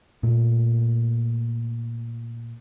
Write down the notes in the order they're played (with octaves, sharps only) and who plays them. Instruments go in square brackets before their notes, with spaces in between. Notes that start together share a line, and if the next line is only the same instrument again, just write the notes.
[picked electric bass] A#2 A3